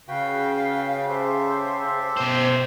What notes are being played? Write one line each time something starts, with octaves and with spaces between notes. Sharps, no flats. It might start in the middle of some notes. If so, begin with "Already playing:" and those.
C#3 F#4 B4 F5 G5
G4 A4 C5 E5
B2 C5